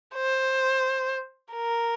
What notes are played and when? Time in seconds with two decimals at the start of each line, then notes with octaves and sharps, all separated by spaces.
0.15 C5
1.53 A#4